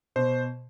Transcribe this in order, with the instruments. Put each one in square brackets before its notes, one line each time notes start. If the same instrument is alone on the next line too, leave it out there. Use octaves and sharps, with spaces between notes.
[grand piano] B2 [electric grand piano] C5